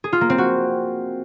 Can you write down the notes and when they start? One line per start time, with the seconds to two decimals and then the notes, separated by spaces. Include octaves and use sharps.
0.04 G#4
0.13 F4
0.21 A#3
0.30 C4
0.38 F#4